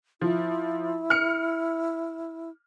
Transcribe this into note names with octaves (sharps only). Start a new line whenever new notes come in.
F3 E4
F6 C#7